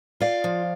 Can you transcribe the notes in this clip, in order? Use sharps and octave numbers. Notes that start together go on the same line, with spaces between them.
F4 D5 F5
F3